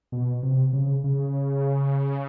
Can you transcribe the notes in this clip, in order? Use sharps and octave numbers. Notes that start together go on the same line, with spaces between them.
B2
C3
C#3
C#3